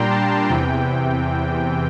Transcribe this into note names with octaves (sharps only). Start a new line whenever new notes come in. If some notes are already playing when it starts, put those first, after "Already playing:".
Already playing: A#2 G3 D4 G5 A#5 C6
A5
E2 C3 E3 G5